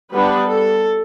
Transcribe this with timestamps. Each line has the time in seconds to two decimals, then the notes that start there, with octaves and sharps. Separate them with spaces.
0.14 G3 B3 D4 B4
0.48 A4